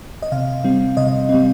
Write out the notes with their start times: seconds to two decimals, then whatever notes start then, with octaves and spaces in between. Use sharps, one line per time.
0.22 D#5
0.32 C3 F5
0.64 G3 C4
0.97 C3 D#5
1.29 C4
1.34 G3